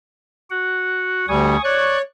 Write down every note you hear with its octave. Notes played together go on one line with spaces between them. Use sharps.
F#4 F#5
D2 G3 G#5 C#6 D#6
C#5 D5 C#6 F#6